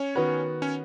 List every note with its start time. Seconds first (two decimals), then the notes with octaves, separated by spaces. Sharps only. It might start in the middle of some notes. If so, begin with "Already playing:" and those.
Already playing: C#4 C#5
0.15 D#3 B3 F#4 B4
0.62 C#4 C#5